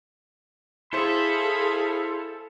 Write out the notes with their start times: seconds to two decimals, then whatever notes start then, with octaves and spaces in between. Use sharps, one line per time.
0.93 E4 G#4 A4 C5 F5 B5